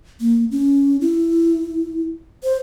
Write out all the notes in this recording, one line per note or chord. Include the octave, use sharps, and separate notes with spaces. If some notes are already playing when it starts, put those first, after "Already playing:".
A#3
C#4
E4
C5